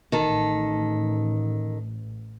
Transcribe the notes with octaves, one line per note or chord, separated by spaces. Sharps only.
A1 D#3 A4